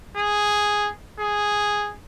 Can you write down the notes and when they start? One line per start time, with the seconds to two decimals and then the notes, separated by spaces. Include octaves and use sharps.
0.17 G#4
1.20 G#4